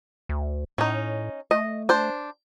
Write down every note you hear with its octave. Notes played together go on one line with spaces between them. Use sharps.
D2
A2 C#4 D#4
A3 D#5
D4 C5